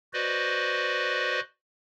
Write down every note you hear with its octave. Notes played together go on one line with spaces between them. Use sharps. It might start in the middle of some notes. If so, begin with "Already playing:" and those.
F#4 B4 C5 D5 D#5